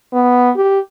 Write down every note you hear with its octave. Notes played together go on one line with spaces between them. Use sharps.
B3
G4